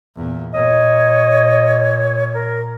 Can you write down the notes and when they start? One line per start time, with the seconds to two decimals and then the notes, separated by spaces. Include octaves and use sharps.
0.16 E2 A#2
0.54 A#2 C#5 D#5
2.33 A#4